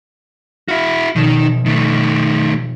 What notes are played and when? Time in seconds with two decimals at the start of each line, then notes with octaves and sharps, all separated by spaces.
0.68 E4 F#4 F5
1.16 F1 B2 D#3 E7
1.66 D#3 A3